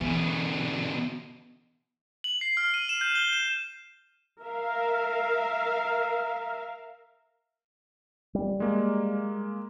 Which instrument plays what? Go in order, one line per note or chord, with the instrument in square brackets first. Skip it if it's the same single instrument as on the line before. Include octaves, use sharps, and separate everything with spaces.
[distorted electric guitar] B2 D3 [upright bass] E3
[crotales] F#7
C7
F6
D#7
E7
G6
G7
E7
[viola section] A#4 E5 F5
[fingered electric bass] G3
[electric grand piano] G#3 A#3